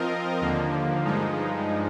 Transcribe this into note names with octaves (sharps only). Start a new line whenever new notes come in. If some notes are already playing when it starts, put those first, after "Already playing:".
Already playing: F3 C4 F4 A#4 D#5
D#2 D3 F3 A#3
G2 F3 G#3 D#4